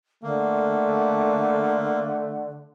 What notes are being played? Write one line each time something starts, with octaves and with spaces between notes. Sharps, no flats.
D3 A3 A#3